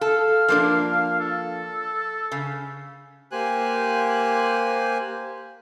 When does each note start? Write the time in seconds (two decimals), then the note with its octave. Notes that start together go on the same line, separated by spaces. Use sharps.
0.01 A4 F5
0.48 F3 A#3 D4
1.20 A4
2.32 C#3
3.31 A#3 G4 C5 G#5 F#6